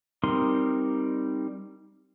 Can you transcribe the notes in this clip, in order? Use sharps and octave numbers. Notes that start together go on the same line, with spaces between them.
G3 C4 D#4 A#4 C6